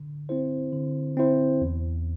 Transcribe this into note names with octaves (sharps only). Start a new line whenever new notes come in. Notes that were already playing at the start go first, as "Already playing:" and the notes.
Already playing: D3
C4 E4 C5
D3
C4 E4 C5
E2